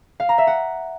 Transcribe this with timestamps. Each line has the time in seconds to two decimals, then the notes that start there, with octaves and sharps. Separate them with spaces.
0.20 F5
0.29 A#5
0.38 E5
0.47 F#5